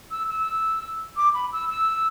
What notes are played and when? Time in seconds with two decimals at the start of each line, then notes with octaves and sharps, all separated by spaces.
0.11 E6
0.28 E6
1.17 D6
1.34 B5
1.53 E6
1.70 E6